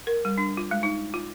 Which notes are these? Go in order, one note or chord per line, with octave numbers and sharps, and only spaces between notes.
A#4
G3
D4
F4
G#3
D#4
F4